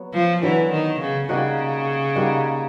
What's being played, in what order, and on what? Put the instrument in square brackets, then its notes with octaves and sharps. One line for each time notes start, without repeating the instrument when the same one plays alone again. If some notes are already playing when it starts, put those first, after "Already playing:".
Already playing: [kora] F#3 B3
[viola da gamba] F3
[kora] D3 F#3 B3 [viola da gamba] E3
[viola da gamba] D#3
C#3
[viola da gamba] C#3 [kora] G3 A#3 D#4 F#4
[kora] G3 A#3 D#4 F#4